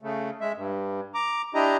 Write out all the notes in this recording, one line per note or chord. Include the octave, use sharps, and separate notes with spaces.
C#3 A3
G#3 E5
G2
A#5 D6
D4 E4 G4 D#5 A#5